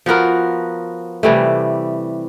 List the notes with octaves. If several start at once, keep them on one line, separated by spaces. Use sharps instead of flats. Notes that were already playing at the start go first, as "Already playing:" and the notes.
F3 B3 F#4 A#4
C3 E3 G3 A3